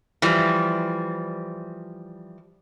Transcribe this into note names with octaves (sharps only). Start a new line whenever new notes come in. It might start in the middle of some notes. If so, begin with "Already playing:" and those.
E3 F3 G3